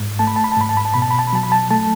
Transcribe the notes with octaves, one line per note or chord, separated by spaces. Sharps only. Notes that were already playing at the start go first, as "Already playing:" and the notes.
Already playing: G#2
A3 A5
B5
A5
B5
A5
G#2 B5
A5
B5
A5
B2 B5
A5
B5
A5
B5
F#3 A5
B5
A5
A3 A5